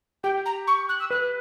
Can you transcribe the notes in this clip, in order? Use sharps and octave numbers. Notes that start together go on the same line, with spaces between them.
G4 G5
A#5
C#6
F#6
E6
B4 F#6